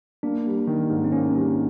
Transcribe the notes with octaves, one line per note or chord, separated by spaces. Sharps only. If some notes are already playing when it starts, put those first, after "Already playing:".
A#3 D4
G3
D#3
G#2
C4
A#3 C#4
G3